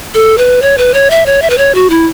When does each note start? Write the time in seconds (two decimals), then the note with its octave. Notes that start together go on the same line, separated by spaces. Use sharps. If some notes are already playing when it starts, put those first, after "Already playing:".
0.14 A4
0.38 B4
0.62 C#5
0.78 B4
0.94 C#5
1.10 E5
1.26 C#5
1.42 E5
1.50 B4
1.58 C#5
1.75 F#4
1.90 E4